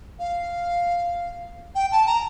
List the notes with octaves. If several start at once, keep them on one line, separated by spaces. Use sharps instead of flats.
F5
G5
A5
A#5